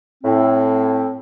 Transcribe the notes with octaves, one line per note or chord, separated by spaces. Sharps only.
A2 C4